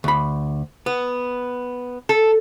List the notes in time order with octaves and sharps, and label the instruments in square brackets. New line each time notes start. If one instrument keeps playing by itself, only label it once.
[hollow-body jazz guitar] D2 B5
B3
[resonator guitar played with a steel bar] A4